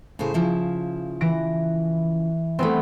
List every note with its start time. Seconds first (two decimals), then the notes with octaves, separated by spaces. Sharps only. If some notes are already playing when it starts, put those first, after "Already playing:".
0.19 A2 C#3 C5
0.34 C#3 F3 E4
1.21 E3 A#6 D7
2.59 E3 G3 A3 B3 C4